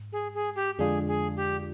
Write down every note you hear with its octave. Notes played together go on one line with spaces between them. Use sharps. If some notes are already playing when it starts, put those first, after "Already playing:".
Already playing: G#2
G#4
G#4
G4
F2 D3 G#3 D4 F4 G#4
G#4
G4